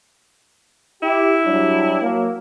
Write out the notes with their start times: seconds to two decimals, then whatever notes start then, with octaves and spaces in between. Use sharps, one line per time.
1.03 E4 G4
1.44 F#3 G3 D4
2.02 F#3 A#3